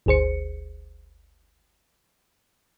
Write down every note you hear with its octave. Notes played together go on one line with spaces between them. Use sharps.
G1 D2 G#4 C5 C#7